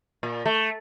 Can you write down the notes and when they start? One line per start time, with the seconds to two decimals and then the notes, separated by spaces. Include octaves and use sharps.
0.23 A#2
0.46 A3